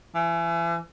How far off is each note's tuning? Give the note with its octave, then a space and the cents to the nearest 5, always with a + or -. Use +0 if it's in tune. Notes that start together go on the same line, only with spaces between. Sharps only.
E3 +35